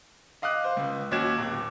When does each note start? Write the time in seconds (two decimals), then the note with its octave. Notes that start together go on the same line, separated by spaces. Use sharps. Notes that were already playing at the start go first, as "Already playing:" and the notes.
0.42 D#5 F5 D6 D#6 F#6
0.64 C5
0.77 C#2
1.11 D#2 C#4 F#4 D6 G#6 E7
1.38 D1 D6